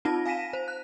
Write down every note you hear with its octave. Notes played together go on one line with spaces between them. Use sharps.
C4 D#4 F4 A5 A#6
F5 G#5 A#6 B6 D#7 E7
C5
F#6